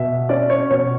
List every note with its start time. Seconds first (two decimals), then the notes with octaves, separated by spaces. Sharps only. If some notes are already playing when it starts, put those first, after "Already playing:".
Already playing: B2 E5
0.29 C#4 D5
0.50 C#5
0.70 B2 C#5